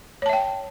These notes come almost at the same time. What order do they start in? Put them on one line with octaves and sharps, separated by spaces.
C#5 A5 E5 G5